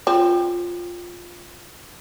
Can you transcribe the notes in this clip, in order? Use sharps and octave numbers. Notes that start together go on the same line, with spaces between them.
C4 F4